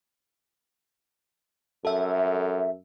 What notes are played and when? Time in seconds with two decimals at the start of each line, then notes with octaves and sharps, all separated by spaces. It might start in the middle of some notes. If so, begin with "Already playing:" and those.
1.85 F#2 A4 E5